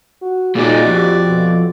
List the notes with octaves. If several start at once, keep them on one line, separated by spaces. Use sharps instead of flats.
F#4
A#2 D#4 F#4 G#4 D5
F2 G4
B2